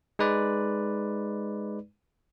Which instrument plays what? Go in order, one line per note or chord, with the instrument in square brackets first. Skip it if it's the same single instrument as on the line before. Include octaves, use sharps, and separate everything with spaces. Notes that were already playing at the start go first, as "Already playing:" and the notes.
[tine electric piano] G#3 D#4 B4 D5